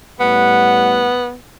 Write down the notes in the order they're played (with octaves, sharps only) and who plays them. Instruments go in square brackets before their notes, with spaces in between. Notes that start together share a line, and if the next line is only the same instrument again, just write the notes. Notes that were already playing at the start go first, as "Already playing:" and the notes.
[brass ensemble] A2 G3 F#5 [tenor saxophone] B3